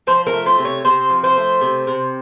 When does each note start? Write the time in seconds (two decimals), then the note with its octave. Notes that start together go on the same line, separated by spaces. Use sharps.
0.07 F3 C5
0.27 A#4
0.33 A3
0.46 C5
0.58 C3
0.65 C#5
0.85 C3 C5
1.10 F3
1.24 C5
1.36 A3
1.61 C3
1.87 C3